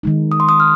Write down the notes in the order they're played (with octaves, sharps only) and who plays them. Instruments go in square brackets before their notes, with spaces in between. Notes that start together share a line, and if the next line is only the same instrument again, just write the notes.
[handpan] D#3 G#3 D#4
[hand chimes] D#6
C6
D#6
F6